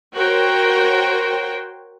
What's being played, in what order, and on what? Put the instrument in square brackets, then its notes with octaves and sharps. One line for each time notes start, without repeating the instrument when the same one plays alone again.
[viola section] F#4 A#4 C5 C#5 G5